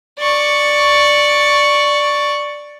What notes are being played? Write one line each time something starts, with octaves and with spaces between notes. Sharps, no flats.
D5 C#6